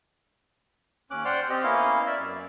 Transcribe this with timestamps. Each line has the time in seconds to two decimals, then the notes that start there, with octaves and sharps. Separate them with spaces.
1.11 D#2 C#4 D6 F#6
1.25 C5 D5 F#5 G5 C6 F6
1.49 C4 G4 D#5
1.63 A#3 B3 C#4 E4 D#5 F5
2.07 D5 E5
2.19 F#2